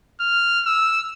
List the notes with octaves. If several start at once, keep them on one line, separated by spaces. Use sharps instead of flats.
F6
E6